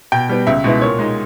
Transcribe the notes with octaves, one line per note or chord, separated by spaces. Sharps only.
B2 G5
G3 B3
C#2 E5
B2 G#3 B3 E4
A#2 C#5
G#3 D#4